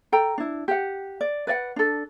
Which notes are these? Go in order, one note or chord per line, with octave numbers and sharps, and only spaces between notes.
A4 G5 A#5
D4 E4
G4 F#5
D5
B4 D5 E5 F#5
D4 A4